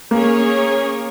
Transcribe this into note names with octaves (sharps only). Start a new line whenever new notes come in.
A#3 C#4 G#4 C#5